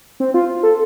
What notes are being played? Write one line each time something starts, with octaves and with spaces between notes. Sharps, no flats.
C4
F4
A4